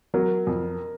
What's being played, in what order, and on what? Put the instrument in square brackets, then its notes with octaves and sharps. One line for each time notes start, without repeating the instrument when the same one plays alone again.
[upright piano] F#3 [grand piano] A#4
[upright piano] F2